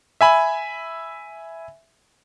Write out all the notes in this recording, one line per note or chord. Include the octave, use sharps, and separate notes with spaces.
E5 G#5 B5